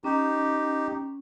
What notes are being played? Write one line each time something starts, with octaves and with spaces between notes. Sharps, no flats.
C#4 D#4 G4